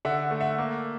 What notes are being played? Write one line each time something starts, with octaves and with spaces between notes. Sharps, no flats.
D3 E5 F#5
A3
E5 F#5
A#3